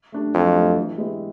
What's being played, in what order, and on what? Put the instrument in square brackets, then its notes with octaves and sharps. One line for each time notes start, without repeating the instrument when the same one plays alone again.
[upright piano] A3 D4 G4
[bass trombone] F2 [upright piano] F#3
[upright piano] A3 D4 G4
E3
G#3 B3 E4 G4